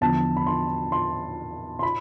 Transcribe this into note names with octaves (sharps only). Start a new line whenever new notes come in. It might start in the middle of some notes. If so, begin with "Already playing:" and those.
E2 D3 F3 A5
B5
C6
C6
C6
B5